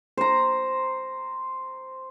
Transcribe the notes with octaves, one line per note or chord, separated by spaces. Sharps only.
C5 A#5